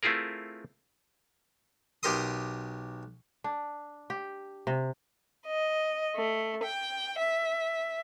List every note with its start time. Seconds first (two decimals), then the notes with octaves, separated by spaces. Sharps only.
0.03 A3 C4 E4 F4 G#4 A#4
2.03 B1 G4 A#4 C6 D#6
3.44 D4
4.10 G4
4.67 C3
5.47 D#5
6.16 A3
6.63 G5
7.20 E5